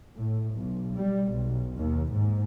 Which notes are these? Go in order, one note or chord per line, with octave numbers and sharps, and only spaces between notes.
A2
B1
G3
B1
D#2
G#2